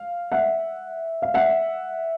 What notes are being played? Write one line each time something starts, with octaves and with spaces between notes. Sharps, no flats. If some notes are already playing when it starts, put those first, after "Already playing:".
Already playing: F5
E5 F#5
F5
E5 F#5